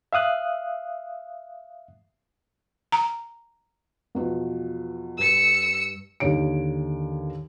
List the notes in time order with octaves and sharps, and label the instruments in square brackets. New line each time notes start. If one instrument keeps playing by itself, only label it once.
[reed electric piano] E5 F5 D#6 F#6
[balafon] A#5
[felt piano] E2 B2 F3
[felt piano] G2 [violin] E6 C#7
[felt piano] D#2 D3 D#3 C#5 D7